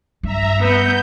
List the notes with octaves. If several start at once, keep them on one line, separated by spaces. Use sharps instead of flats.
G2 E5 A#5
B3 G6